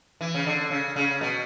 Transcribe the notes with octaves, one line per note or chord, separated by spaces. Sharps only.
E3
C#3
D3
C#3
C#3
B2